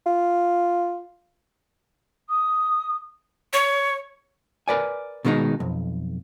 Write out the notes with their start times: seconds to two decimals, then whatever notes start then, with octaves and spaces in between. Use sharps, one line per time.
0.06 F4
2.29 D#6
3.53 C#5
4.68 A#4 B4 D5 G#5
5.25 B2 D#3 G#3 B3 D#4
5.60 B1 F2